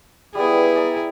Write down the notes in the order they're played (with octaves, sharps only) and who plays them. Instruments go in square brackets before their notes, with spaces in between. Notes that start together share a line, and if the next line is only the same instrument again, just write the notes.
[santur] G3 B3 [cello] E4 G#4
[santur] D5 G#5 A#5